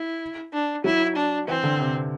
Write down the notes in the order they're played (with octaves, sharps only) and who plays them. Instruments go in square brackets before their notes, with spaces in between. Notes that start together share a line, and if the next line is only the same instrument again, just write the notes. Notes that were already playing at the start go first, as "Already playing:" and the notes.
Already playing: [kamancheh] E4
D4
[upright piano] F#3 [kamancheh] E4
[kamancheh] D4
[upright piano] E3 [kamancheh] C4
[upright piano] D3
C3